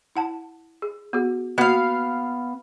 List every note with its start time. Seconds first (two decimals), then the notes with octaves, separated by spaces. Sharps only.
0.16 E4 F#5 A5
0.82 G#4
1.13 B3 F#4 G#4
1.58 A#3 B3 F#4 F5